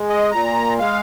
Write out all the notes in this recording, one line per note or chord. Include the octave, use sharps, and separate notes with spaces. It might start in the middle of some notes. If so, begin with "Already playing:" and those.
Already playing: G#3
D#5
A#2 A#5
G#3 F5